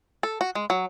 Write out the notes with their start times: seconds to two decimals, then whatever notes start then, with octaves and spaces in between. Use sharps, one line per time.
0.23 A4
0.41 F#4
0.55 G#3
0.70 F#3